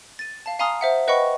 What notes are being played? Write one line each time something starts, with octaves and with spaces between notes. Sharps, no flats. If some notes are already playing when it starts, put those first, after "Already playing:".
A6 D#7
F5 A5
F5 G#5 A#5 C6 D#6 F6
C5 E5 F#5
B4 D#5 F#5 G5 B5 C#6